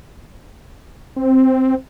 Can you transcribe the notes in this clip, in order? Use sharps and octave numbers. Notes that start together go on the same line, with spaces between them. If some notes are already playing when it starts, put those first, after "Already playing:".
C4